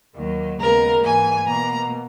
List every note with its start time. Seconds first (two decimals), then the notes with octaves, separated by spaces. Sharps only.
0.16 D#2 D#3 F#3
0.60 D#2 C#3 G#3 B3 A#4
1.03 G#2 E3 A#3 G#5
1.47 B2 A#3 A#5